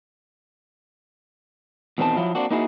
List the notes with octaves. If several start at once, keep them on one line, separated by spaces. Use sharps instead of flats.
E2 B2 D#3 C4 A5
F3 F#3 E4 F4
A#3 C4 D4 F#4
A#3 D#4 E4 F#4 G#4